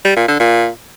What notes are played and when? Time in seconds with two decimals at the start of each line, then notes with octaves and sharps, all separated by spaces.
0.05 G3
0.16 A#2
0.28 D3
0.40 A#2